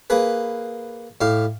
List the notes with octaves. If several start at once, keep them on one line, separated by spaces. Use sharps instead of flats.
A#3 G#4 B4
A2 G4 F5